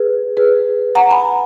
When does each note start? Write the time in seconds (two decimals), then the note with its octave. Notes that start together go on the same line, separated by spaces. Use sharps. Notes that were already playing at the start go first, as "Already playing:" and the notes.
Already playing: G#4 B4
0.37 G#4 B4
0.95 F#5 A#5
1.11 G#5 B5